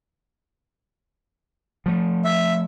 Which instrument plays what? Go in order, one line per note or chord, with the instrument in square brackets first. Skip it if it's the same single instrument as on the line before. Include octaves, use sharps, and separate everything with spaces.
[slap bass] F3 A3
[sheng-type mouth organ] E5